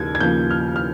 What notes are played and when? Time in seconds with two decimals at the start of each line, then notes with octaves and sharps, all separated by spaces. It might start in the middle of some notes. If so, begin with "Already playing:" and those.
Already playing: D#2 C#3 F3 A#3 G#6
0.15 G#6
0.20 D#2 C#3 F3 A#3 G6
0.51 F6
0.76 F6